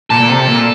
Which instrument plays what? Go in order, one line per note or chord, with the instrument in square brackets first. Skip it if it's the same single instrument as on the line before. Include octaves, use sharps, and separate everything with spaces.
[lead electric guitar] A#2 [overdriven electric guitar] A4
[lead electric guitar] A#2
C3
A#2